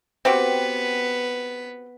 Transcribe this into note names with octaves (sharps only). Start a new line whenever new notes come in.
B3 C4 F#4 G4 B4